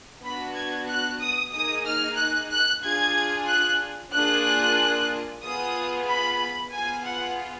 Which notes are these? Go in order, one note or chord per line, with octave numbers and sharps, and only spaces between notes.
B3 D4 F#4 B5
G#6
F#6
D#6
A#3 D#4 G#4 D#6
F6
F#6
F#6
D4 F4 G#4 G#6
F#6
A#3 D4 F4 G#4 F#6
B3 F4 G#4 D#6
B5
B3 F4 G#4 G#5
F#5